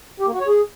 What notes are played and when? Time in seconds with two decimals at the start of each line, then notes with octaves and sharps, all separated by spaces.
0.20 G4
0.27 A#3
0.34 F#4
0.41 C#5
0.48 G#4